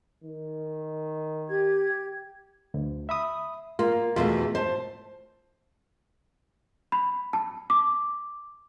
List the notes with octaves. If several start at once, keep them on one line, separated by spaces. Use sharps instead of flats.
D#3
G4 G#6
D2
E5 B5 D#6
A#3 F4
E2 B2 A3 F4
C5 A5
B5
A5
D6